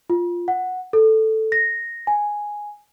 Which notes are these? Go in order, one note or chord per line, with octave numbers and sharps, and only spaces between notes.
F4
F#5
A4
A#6
G#5